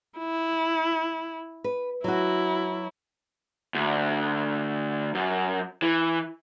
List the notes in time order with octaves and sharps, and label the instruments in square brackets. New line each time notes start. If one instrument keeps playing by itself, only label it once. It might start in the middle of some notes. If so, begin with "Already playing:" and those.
[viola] E4
[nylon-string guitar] B4
[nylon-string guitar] F#3 F#4 [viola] E4
[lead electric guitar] D2
F#2
E3